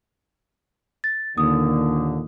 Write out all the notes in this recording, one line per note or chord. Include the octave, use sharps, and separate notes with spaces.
A6
D#2 A#2 D3 D#6